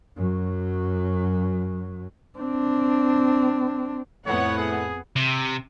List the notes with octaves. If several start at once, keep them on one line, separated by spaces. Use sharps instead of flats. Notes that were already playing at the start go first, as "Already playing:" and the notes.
F#2 F#3
C4 D4
F2 A2 B3 C#5 F#5
G#4
C3